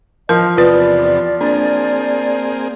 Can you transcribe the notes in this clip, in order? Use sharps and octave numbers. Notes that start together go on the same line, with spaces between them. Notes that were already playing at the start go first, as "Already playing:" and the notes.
F3 A#4 D#5
E2 C3 B3 F4 B4 D5
A#3 C4 D4 G#4